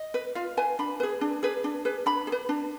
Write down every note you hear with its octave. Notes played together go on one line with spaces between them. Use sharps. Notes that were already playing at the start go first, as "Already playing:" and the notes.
Already playing: D#5
B4
F4 F5
B4 G#5
D4 B5
G#4 B4
D4
G#4 B4
D4
G#4 B4
D4 B5
G#4
B4
D4